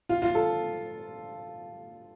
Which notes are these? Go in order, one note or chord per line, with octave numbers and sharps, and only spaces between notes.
F4
F4
A4